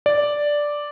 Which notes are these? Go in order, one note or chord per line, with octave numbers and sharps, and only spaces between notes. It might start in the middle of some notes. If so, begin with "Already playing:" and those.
D5